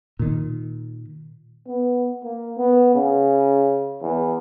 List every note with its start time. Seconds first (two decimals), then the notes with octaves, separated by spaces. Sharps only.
0.19 A#2 D#3
1.68 B3
2.24 A#3
2.57 B3
2.95 C#3
4.02 E2